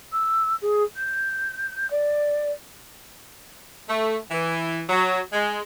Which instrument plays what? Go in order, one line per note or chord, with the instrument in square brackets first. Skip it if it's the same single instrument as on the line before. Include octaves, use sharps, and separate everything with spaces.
[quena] E6
G#4
G6
D5
[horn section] A3
E3
F#3
G#3